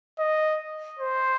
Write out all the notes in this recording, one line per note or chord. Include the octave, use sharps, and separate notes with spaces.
D#5
C5